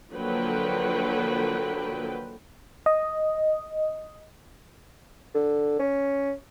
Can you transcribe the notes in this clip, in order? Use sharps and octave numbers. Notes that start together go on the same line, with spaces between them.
D3 F3 F#3 A#3 B4 G5
D#5
D3
C#4